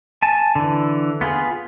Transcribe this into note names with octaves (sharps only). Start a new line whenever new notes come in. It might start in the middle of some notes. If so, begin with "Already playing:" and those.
G#5 A5
D3 E3
B3 F4 G#4